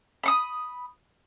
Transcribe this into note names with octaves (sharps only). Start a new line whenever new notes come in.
B5 C#6 D#6